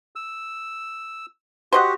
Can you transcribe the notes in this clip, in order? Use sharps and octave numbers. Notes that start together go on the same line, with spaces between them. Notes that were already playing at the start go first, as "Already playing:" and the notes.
E6
F#4 G4 C5 D#5 F#5